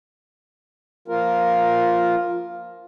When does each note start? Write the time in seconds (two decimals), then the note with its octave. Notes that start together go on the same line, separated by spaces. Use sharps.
1.08 F3 A#3 F4 A#4